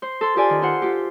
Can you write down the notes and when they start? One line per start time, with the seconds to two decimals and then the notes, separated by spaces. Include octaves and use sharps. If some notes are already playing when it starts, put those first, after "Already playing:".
0.02 C5
0.21 A4 C6
0.36 F4 G4 A4 D5 G#5
0.50 D#3
0.62 F4 C5 F#5
0.82 F4 G4